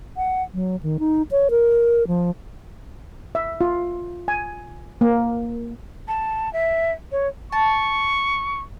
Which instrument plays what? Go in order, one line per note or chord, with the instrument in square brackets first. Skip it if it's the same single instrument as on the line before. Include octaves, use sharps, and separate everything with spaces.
[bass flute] F#5
F#3
D#3
D#4
C#5
A#4
F3
[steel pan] E5
F4
G#5
A#3
[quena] A5
E5
C#5
[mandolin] A5 [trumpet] C#6